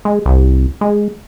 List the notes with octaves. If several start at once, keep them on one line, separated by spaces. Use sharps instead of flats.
G#3
C2
G#3